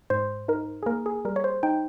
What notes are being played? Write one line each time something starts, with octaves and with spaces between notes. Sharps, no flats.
G#2 C5
D#4 A#4
G#4
A#3 A#4
G#4
G3 A#4
C#5
C5
D#4 G5